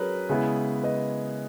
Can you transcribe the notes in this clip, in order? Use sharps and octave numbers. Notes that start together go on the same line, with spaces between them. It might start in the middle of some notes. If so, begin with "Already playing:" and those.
Already playing: F#3 C#4 G#4 A#4 B4
C#3 G#3 B3 E4
B4 D#5